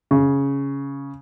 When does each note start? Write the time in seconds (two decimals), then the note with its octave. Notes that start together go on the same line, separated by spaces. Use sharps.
0.11 C#3